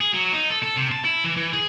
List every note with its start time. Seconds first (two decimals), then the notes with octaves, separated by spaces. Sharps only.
0.01 G#4
0.13 F#3
0.32 D#4
0.50 A4
0.63 A4
0.77 C3
0.92 A5
1.05 E4
1.24 E3
1.37 E3
1.53 G#4